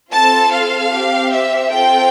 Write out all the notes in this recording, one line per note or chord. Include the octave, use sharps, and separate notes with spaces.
C4 F4 A4 A5
F5
C4 G4
E5
C4 F4 A4 G5